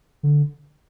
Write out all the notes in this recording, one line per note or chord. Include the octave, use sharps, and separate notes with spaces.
D3